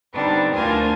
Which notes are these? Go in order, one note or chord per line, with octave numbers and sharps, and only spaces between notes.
D3 G3 B3 C4 D4 D#4
D2 D4 F4 A#4 C5 G#5